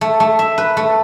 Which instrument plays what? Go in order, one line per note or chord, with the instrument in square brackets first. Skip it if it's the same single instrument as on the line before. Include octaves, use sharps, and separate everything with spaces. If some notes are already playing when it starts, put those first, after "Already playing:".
[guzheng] A3
A3
E5
B4
A3